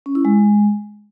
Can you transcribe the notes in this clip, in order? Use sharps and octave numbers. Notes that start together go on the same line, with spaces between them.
C#4
E4
G#3